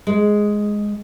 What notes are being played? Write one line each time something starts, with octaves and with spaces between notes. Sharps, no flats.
G#3